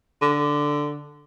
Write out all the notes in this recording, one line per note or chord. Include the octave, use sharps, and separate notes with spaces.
D3